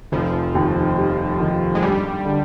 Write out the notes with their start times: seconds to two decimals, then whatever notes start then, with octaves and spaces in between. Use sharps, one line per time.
0.12 F1 F3
0.55 D#2
0.98 G3
1.40 D#3
1.75 G#3
1.82 G2 G3
2.25 D3